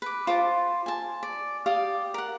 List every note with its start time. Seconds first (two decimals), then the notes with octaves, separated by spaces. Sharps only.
0.02 B4 D6
0.27 F4 C5 A5 D6
0.86 G#5 A5
1.23 D5
1.66 G4 D5 F5 D#6
2.14 A#4 F#5